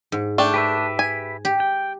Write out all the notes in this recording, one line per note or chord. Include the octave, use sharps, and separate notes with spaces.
G#2
A3 D4 G5
G4 B4 E5
G#5
G4
G5